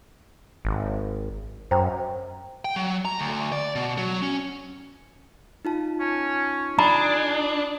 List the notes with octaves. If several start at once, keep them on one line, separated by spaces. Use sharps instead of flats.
G#1
F#2 C5 G5 A#5
G5
F#3
A#5
D2
D5
B2
F#3
C#4
D#4 F4 A5
C#4
D4 G#4 A#5 B5